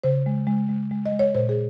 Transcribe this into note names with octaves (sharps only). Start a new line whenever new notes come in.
C#3 C5
G#3
G#3
G#3
G#3
D#5
G#3
C#5
A#2 C5
G#4